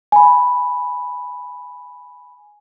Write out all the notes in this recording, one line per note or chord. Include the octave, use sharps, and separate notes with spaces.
G#5 B5